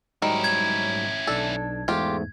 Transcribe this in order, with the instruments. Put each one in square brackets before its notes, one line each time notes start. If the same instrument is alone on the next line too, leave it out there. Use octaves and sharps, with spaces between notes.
[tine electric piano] G#2 F#3 G3 [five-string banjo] D#3 [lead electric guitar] C#4 E4
[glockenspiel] G#6
[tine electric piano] B1 D4 D5 [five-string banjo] A4
[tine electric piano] E2 G#2 A3 [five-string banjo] F4 G4